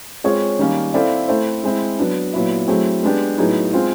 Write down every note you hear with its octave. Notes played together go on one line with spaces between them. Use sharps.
G#3 C4 F4 G#4 C#5
D#3 G3 A#3 C#4
C4 E4 A4 D5 F5
A3 C4 E4 A4 C5
G#3 C4 E4
F#3 B3 D4
A#2 F#3 B3 E4
F#3 A3 C4 E4 G#4
G#3 B3 D4 G4
A2 F#3 B3 D#4 G#4
G#3 C4 F4